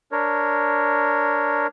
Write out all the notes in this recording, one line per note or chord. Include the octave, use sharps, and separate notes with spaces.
D4 A#4 C#5